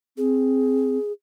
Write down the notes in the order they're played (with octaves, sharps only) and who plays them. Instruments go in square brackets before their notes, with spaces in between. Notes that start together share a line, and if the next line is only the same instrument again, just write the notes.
[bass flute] C4 [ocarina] G#4